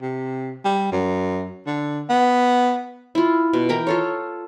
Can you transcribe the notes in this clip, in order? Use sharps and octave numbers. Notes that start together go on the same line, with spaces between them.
C3
G3
F#2
D3
B3
E4 F4
B2
E3 A#4 G5 A#5
F4 A4 C#5